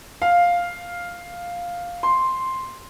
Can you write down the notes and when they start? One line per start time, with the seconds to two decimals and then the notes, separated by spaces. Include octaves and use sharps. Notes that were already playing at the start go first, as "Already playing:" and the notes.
0.22 F5
2.03 C6